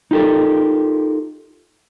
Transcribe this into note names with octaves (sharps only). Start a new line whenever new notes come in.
D#4 F4 G4 A4 A#4